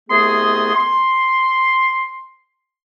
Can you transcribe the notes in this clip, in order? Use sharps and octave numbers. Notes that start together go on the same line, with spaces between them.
C2 A3 B3 G#4 D#5 C6
C6